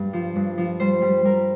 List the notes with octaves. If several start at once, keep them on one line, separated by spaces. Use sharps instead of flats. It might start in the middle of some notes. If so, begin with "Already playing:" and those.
Already playing: G2
F3
G2
F3
G3 C5
G3
G3 A#4